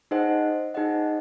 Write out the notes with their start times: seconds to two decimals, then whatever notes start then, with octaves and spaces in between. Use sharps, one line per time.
0.11 D#4 G#4 C5 D#5 F#5
0.74 D#4 G#4 C5 D#5 F#5